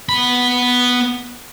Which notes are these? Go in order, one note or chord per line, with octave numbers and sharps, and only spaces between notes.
B3 B5